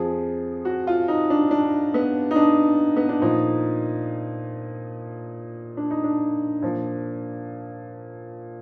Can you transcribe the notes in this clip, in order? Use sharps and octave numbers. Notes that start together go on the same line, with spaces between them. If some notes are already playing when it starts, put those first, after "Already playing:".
Already playing: F2 F3 G#4
F#4
F4
D#4
D4
D4
B3
D#4
D4
B3
D4
A#2 F3 D#4
D4
D#4
D4
A#2 F3